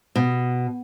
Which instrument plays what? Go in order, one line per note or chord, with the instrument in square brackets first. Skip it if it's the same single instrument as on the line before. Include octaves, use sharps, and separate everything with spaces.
[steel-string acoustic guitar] B2